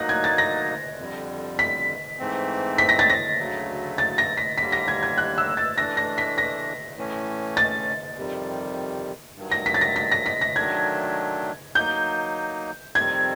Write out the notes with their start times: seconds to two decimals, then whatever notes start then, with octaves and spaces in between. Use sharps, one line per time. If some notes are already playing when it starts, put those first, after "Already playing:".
Already playing: F#3 A#3 D#4 F#6 A#6
0.09 G#6
0.24 A6
0.38 A#6
0.99 F2 D3 G3
1.59 B6
2.19 G#2 E3 A3 C4
2.78 B6
2.89 A#6
2.99 A6
3.10 A#6
3.38 D2 C#3 F#3 A3
3.98 A6
4.18 A#6
4.37 B6
4.58 D#2 D3 G3 A#3 B6
4.72 A#6
4.88 G#6
5.03 G#6
5.18 F#6
5.38 E6
5.57 A6
5.77 E3 A3 D4 A#6
5.97 A#6
6.18 B6
6.38 A#6
6.97 A2 E3 A3 C#4
7.57 A6
8.17 F2 C3 D#3 G3
9.36 G2 D#3 F#3
9.51 A#6
9.66 B6
9.74 A6
9.81 A#6
9.96 B6
10.12 A#6
10.26 B6
10.41 A#6
10.56 D#3 F#3 A3 D4 G#6
11.75 F#3 A#3 D#4 G6
12.95 F2 C3 D#3 G3 C4 G#6